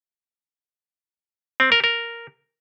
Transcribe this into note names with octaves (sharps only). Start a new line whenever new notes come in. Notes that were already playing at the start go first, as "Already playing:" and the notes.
C4
A#4
A#4